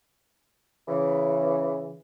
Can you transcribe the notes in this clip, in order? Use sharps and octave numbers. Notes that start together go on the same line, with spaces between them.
C#3 E3